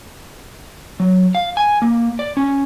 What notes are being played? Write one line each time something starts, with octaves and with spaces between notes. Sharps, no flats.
F#3
F5
G#5
A#3
D5
C#4